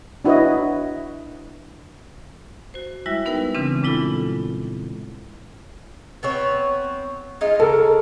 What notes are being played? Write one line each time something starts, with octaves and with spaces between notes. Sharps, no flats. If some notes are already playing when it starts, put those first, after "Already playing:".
D4 E4 F#4 B4 C#5 D#5
F#4 C5
G3 G#3 E4 F#4 E5
B3 D#4 A#4 B4 G5 E6
C#3 E3 G#3 C4 D4
A#2 G#3 E4 F4 A4 B5
B3 C4 C#5
G#3 D#4 F4
C#3 A4 A#4